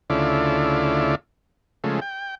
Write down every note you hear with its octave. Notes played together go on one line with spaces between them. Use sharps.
D2 C#3 A3 E4 F4 D5
C#3 F3 G#3 A3
G5